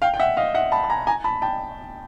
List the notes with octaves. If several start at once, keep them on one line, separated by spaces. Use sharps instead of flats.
F5 G5
G5
E5 F#5
D#5 F5
E5 F#5
A5 B5
A5
G#5 A#5
G#5 A#5
A5 B5
G5 A5